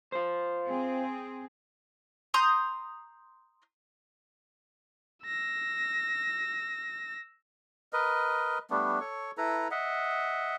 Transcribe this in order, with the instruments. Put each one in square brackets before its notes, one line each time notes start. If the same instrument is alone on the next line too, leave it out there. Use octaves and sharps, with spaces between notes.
[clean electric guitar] F4 C5
[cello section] C4 G#4
[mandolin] A#5 C6 D#6 G6
[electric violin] E6 A#6
[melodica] A#4 B4 D#5
G3 A3 B3 D4
A4 C#5 C#6
E4 A4 B4 A#5
D#5 E5 F#5